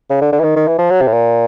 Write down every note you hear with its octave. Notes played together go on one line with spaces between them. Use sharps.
C#3
D3
D3
E3
D#3
D#3
E3
F3
F#3
C3
A2
A#2